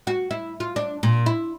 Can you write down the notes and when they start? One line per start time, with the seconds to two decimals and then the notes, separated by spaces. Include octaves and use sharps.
0.07 F#4
0.31 E4
0.60 F4
0.76 D4
1.03 A#2
1.26 E4